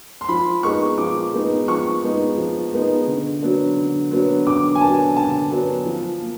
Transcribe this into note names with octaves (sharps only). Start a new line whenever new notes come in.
C6
F3 B5
G#3 B3 D#4 C#6
F3 D6
G#3 B3 D#4
F3 C#6
G#3 B3 D#4
F3
G#3 B3 D#4
D3
F#3 B3 D4
D3
F#3 B3 D4
D3 D6
G#5
F#3 B3 D4 A5
D3 A5
F#3 B3 D4
F3
A#3